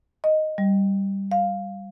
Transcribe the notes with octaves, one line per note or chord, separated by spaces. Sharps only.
D#5
G3
F5